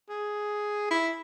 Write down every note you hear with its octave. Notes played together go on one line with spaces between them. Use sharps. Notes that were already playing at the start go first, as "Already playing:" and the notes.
G#4
E4